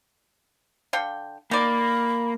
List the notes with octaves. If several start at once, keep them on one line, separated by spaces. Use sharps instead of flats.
D3 F5 G5
D#3 A#3 D5 B5